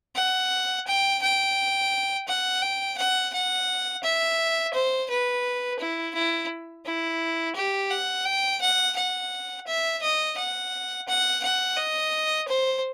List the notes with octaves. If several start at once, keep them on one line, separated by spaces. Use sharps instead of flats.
F#5
G5
G5
F#5
G5
F#5
F#5
E5
C5
B4
E4
E4
E4
G4
F#5
G5
F#5
F#5
E5
D#5
F#5
F#5
F#5
D#5
C5